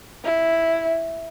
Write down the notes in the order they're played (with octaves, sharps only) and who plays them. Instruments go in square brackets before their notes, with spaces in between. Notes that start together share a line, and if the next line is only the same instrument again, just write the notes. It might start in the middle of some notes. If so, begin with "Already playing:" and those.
[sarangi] E4